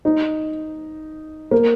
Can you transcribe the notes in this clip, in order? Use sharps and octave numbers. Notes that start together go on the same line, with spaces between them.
D#4
A#3